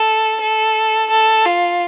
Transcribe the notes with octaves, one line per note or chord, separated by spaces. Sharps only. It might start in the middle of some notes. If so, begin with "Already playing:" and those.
Already playing: A4
A4
A4
F4